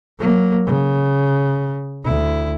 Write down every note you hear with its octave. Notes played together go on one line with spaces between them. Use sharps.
F#3 A#3
C#3
D2 E4